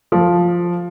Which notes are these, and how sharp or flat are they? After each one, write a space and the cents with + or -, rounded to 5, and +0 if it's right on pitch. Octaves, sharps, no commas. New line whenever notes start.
F3 +0